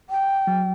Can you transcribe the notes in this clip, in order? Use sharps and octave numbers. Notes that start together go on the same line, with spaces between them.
G5
F#3